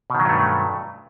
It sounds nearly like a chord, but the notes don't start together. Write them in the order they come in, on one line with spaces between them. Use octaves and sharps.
B2 D#3 F#3 G2 A3